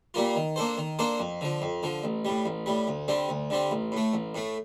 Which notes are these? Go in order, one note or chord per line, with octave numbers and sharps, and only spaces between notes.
A#2 G3 A#3 F4
D#3
A#3 D4 A4 C5
D#3
A#3 D4 A4 C5
F2
D3 F3
F2
D3 F3
A1
A2 G3
A1
A2 G3
D2
D3 G3 C4
D2
D3 G3 C4
A1
A2 A3
A1
A2 A3